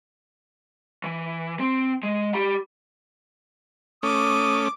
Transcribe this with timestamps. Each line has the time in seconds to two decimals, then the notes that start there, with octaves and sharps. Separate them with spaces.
1.04 E3
1.60 C4
2.03 G#3
2.34 G4 B5
4.03 A3 C#4 D6 D#6